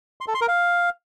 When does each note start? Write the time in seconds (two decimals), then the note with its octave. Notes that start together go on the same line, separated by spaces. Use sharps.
0.21 C6
0.28 A4
0.35 C6
0.41 A#4
0.48 F5